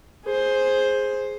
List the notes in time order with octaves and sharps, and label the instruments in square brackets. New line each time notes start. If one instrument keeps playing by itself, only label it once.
[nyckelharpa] G#4 C5